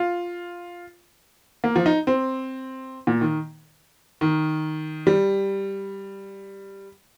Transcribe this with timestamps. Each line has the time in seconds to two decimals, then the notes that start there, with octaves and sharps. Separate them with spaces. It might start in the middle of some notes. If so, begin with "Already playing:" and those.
Already playing: F4
1.64 A#3
1.76 F3
1.86 D#4
2.07 C4
3.07 A#2
3.21 D#3
4.21 D#3
5.07 G3